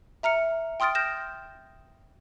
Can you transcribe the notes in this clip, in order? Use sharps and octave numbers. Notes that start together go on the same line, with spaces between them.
E5 A#5 F6 C#7
G5 C6 D#6 F6 A6 D7
F6 G6 A#6 E7